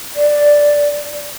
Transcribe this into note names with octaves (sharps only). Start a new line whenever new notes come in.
D5